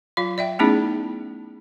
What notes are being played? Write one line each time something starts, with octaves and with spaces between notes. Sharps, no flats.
F#3 F4 F5
D5 E5 G5
A3 B3 C#4 D#4 E4 G#4